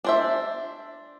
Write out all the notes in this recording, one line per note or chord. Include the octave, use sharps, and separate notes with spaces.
D4 C5 E5